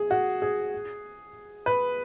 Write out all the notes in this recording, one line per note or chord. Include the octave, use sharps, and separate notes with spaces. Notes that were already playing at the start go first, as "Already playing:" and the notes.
Already playing: G#4
F#4
G#4
B4